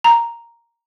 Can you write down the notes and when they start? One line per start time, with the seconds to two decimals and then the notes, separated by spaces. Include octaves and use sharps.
0.04 A#5